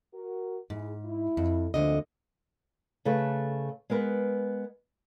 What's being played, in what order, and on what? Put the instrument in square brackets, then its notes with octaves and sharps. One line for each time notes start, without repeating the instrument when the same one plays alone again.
[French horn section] F#4 A#4
[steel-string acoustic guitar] G#2 [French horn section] E4 G#4
[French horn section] E4
[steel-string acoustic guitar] F2
[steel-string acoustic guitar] D2 D3 D#5 [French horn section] F3 A#3 C4
[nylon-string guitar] C#3 A3 A4 B4
G#3 B3 A#4 B4